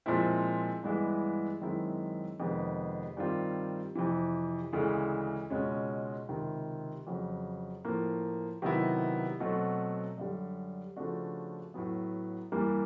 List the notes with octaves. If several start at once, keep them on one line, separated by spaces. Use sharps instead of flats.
A#2 F3 G#3 C4 E4
G2 E3 G#3 B3 E4
F#2 D#3 G#3 C4 E4
F2 C3 D#3 G#3 B3
G2 D#3 G3 C4 F4
F2 C3 E3
D2 C#3 E3 G#3
C#2 B2 G#3 C#4
C#2 C3 D#3
F2 C#3 F#3
A2 F3 A#3
C3 D#3 F#3 B3 E4
B2 F#3 A3 C4
F#2 D3 G3
C#3 F3 A3 D4 F#4
A2 F#3 B3
G2 E3 G3 A#3